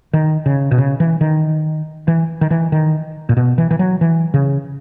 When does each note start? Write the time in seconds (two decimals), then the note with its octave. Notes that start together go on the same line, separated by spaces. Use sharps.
0.13 D#3
0.46 C#3
0.71 B2
0.78 C#3
1.00 E3
1.21 D#3
2.08 E3
2.41 D#3
2.51 E3
2.72 D#3
3.29 A#2
3.37 B2
3.58 E3
3.71 E3
3.79 F#3
4.01 E3
4.34 C#3